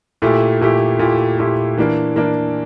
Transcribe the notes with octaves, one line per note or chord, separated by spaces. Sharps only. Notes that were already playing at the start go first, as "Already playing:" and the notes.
A#2 A3 E4 G4
A#2 A3 E4 G4
A#2 A3 E4 G4
A#2 A3 E4 G4
E3 A#3 D4
E3 A#3 D4